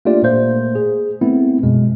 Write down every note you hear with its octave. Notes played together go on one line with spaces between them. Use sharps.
A3 A#3 D4 F4 G4 D5
A#2 A3 A#3 C5 G6
G#4
A3 B3 C4 E4
F#2 B2 G#3